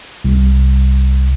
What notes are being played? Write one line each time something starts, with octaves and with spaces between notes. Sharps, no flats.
C2